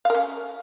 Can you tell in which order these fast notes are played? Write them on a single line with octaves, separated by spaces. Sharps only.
F5 A#4 C#4